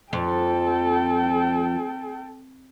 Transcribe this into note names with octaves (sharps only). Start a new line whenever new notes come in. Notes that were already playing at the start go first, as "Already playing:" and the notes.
F2 A4 G5